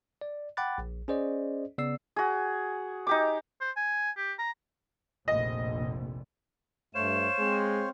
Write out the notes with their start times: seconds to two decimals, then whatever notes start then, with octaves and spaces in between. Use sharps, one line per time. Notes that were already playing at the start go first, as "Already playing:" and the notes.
0.21 D5
0.57 F#5 G5 B5 D6 F#6 A6
0.78 A#1
1.08 C#4 G#4 C5 D5 D#5
1.78 C#3 B3 D5 E6 C7
2.16 F#4 G#4
3.07 D#4 G4 D6
3.61 C5
3.76 G#5
4.17 G4
4.39 A#5
5.28 F1 A#1 D#5
6.95 G2 A3 C5 C#5 F5 E7
7.39 G#3 C4